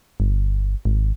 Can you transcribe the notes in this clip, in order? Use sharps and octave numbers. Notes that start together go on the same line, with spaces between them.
G1
G#1